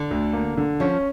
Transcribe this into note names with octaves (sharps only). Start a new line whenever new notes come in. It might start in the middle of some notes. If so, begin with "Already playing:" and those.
Already playing: D3
D2
A#3
D3
F3 C#4